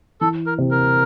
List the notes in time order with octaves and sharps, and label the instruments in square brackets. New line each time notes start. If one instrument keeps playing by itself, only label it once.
[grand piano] E3 [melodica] A4
[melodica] A#4
[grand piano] C3
[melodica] A#4